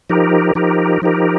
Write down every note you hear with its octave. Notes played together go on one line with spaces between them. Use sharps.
F3 D#4 G4 A#4
F3 D#4 G4 A#4
F3 D#4 G4 A#4